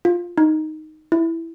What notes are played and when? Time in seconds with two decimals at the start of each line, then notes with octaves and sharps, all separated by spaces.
0.05 F4
0.38 D#4
1.12 E4